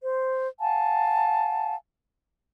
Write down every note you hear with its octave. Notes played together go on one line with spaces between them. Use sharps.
C5
F5 F#5 G#5 A5